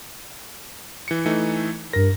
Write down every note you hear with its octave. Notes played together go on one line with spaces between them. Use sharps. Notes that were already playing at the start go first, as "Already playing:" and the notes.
E3 C#7
E3 A3 D#4
G2 A#4 A#6